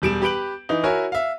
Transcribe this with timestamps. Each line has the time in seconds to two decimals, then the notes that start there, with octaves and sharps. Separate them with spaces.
0.02 E1 G3 D7 E7
0.22 G4 B4 G6 D7 F#7
0.69 E3 D#4
0.83 E4 F#4 A#4 C#5 E5 G#5
1.12 E5 F5